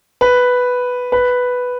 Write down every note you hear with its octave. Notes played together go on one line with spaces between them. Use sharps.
B4
B4